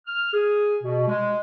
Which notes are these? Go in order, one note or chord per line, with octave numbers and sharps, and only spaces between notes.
F6
G#4
B2
G#3